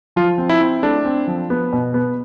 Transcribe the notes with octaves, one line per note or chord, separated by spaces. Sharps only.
F3 F4
C4
E4
C4
A3 D4
C4
F3
B3
B2
B3